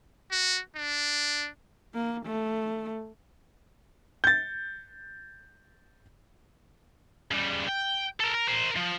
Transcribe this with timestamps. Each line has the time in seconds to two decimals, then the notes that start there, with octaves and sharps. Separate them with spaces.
0.31 F#4
0.76 D4
1.94 A#3
2.26 A3
4.24 G6 A6
7.31 C#3 G3
7.67 G5
8.20 A4 A#4
8.35 A#4
8.48 A#4 C5
8.77 F3